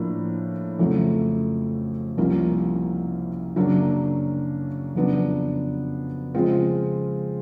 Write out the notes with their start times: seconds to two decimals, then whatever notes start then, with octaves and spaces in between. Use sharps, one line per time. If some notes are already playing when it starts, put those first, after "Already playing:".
Already playing: A2 F3 A#3 D4
0.79 F2 C#3 F#3 A3
2.17 C2 C3 F3 A#3 C#4
3.56 F#2 C#3 F#3 A#3 D4
4.95 F2 C#3 F#3 B3 D4
6.35 C#3 F3 G#3 C4 F4